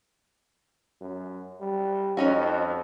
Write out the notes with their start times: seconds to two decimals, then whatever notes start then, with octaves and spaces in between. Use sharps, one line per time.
1.01 F#2
1.60 G3
2.17 F2 C#4 D#4 F#4